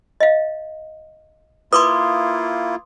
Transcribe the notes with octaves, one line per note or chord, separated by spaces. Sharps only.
D#5 F5
A#3 E4 F4 B4 C6 D6 D#6